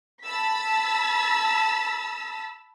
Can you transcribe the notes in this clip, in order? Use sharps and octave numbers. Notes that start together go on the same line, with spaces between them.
A5 B5 E6 A6 B6